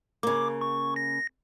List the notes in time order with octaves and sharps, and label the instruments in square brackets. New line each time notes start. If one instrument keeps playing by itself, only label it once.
[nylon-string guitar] C#3 A#3 [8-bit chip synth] D6
[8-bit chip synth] C#6
A#6